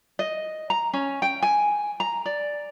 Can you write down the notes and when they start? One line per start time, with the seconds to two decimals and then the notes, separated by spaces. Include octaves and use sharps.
0.19 D#5
0.70 A#5
0.93 C#4
1.22 G5
1.42 G#5
2.00 A#5
2.26 D5